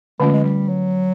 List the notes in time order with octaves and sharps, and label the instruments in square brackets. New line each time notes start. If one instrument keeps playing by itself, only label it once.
[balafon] D3 F3 A3 C#4 F4 [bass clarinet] G#3
[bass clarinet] G#3
G3
F#3